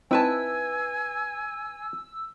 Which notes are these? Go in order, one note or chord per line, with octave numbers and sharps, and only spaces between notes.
C4 D#4 E4 B4 G#5 A5 E6